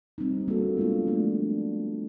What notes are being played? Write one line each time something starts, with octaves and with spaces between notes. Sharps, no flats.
G3 C4 D#4
G3 A#3 D4 F#4 A4
G#3 B3 D4 F4
F3 A3 D4